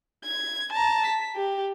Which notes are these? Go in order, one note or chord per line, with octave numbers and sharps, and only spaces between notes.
G#6
A5 A#5
B6
G4